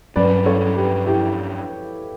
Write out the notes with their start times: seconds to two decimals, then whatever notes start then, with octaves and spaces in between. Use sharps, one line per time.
0.16 G2 F#3 C#4 B4 D5
0.46 A4 C#5
0.76 G4 B4
1.06 E4 G4